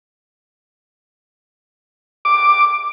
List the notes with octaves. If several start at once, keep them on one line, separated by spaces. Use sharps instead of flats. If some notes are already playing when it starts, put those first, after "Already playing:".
D6